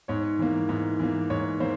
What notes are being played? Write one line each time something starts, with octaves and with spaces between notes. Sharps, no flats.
G#2 C#5
E3 A#3
G#2
E3 A#3
G#2 C#5
E3 A#3 C5